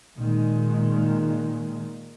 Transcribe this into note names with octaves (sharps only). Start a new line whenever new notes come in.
A#2 D#3 G#3